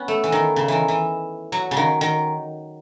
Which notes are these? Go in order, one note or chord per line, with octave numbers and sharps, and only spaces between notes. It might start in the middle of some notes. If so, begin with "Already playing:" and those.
Already playing: B3 C#4
A3
E3
D#3
C#3
D#3 E3
E3
F#3
C#3
D#3
D#3